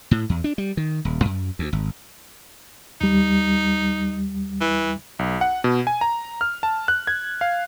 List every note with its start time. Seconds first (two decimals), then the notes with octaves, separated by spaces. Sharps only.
0.11 A2
0.29 E2
0.44 D4
0.58 G3
0.77 D#3
1.05 D#1
1.25 F#2
1.59 D2
1.73 G#1
3.01 D#2 G3 D#4
4.61 E3
5.19 B1
5.41 F#5
5.64 B2
5.87 G#5
6.01 A#5
6.41 F6
6.63 A5
6.88 F#6
7.07 G#6
7.41 F5